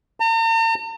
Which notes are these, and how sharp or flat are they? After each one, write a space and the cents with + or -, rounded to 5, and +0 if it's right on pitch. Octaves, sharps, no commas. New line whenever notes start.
A#5 -45